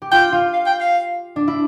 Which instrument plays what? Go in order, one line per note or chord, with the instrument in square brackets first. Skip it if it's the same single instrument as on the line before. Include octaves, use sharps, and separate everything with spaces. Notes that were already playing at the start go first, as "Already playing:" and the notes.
[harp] G4
[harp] F4 [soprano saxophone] G5
[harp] F4
[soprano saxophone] F5
G5
F5
[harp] D4
E4